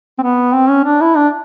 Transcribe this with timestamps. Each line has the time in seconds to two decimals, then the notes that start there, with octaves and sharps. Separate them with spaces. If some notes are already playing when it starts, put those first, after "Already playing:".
0.18 C4
0.22 B3
0.53 C4
0.69 C#4
0.84 D4
1.01 E4
1.16 D4